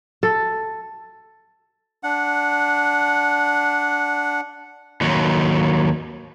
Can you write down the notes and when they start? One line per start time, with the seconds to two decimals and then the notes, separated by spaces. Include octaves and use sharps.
0.23 A4
2.03 D4 F#5
5.01 D#2 F#3